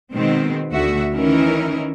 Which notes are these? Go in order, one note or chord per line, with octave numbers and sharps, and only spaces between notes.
B2 D#3 G#3 B3 C4
D2 A3 F#4 E5
D#3 E3 C#4 D#4 E4 A#4